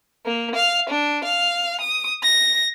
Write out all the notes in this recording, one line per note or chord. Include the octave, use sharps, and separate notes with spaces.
A#3
F5
D4
F5
D#6
A#6